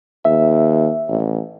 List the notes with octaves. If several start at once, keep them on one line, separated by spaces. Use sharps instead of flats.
D#2 E5
A1